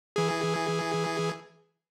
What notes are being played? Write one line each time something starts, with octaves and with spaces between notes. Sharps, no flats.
E3 G#4